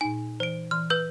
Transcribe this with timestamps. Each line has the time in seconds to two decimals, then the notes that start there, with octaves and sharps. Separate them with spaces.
0.01 A#2 D#4 G#5
0.40 E3 C5 D7
0.71 E3 C6 F6
0.90 B4 E6 G6